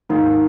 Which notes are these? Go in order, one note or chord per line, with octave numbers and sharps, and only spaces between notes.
G#2 D#3 A#3 D#4 F4 G#4